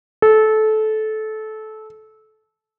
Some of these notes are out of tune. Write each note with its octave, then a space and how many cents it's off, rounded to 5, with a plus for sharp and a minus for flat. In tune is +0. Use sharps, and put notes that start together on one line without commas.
A4 -20